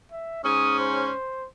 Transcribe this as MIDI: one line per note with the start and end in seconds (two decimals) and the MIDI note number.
0.12 0.43 76
0.44 1.11 44
0.44 1.11 61
0.44 0.78 87
0.79 1.47 72